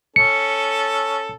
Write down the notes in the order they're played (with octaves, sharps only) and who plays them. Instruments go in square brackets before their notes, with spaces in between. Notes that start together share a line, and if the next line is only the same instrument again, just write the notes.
[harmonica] C#4 A4 [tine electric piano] C#7